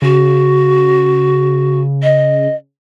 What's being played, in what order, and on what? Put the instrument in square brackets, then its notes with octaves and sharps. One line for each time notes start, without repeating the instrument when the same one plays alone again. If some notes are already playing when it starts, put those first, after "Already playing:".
[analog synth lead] C#3 [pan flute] F#4
[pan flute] D#5